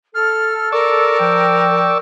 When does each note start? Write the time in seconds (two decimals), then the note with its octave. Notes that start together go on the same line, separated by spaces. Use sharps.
0.14 A4 F6
0.72 A#4 D5 C#6 E6
1.20 F3 G5